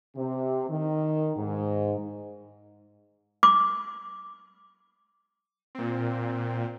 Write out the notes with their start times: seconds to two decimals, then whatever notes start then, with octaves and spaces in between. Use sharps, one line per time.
0.15 C3
0.69 D#3
1.36 G#2
3.43 D6
5.75 A#2 C4